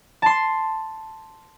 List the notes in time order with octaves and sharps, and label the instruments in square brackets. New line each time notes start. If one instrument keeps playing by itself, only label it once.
[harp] A5 C6